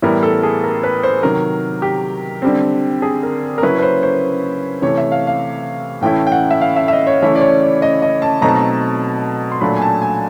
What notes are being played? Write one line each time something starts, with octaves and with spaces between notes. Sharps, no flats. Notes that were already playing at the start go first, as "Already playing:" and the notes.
A2 E3 G3 B3 E4 A#4
A4
G#4
A#4
B4
C5
C3 D#3 F#3 A#4
G4
D3 G3 C4
G#4
A#4
A#4
C#3 F#3 A#3 C#4 E4 B4
B4
C5
C5
C3 E3 A3 C#5
E5
F5
F5
A2 E3 A3 C#4 E4 G5
G5
F#5
E5
F5
E5
E5
D#5
C#5
C#3 E3 A3 C#4 E4 C#5
D5
C#5
D5
D#5
D#5
A5
B2 F#3 A3 C4 D#4 A#5
A5
A#5
C6
A#2 F#3 A3 D4 B5
G#5
A5
G#5